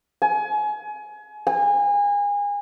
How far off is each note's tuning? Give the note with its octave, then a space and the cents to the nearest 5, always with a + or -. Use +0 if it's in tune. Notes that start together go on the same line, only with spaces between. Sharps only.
G#5 +30
G#5 -30